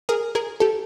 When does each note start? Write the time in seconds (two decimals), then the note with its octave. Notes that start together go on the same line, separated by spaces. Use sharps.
0.09 G#4 A#4
0.35 G#4 A#4
0.60 G4 A4